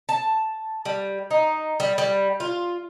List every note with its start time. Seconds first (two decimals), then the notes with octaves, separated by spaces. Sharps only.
0.09 A5
0.85 G3
1.31 D#4
1.80 G3
1.98 G3
2.40 F4